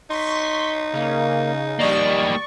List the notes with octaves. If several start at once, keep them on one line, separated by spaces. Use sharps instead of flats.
D#4 C6 C#6 B6
C#3 A#3
D#2 G3 A#3 D4 D5 D#5 C#6